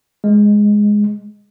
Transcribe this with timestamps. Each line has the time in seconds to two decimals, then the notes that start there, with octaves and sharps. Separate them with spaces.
0.24 G#3